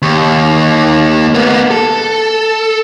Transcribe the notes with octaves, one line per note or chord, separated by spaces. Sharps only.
D#2
A#3 B3
A4